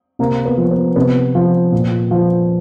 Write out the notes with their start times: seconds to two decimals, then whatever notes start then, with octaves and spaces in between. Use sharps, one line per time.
0.19 C3 A#3
0.45 B3
0.58 F3
0.71 B3
0.96 C3 B3
1.35 F3
1.72 A#2
2.11 F3